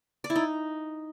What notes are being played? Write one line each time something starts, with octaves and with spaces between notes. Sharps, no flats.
D5
E4
D#4